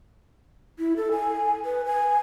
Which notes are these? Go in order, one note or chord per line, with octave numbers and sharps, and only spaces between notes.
E4
A4
G#5
B4
G#5